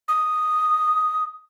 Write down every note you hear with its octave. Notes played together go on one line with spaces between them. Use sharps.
D#6